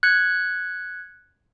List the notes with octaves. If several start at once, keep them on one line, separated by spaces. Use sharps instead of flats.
F#6 G#6 C#7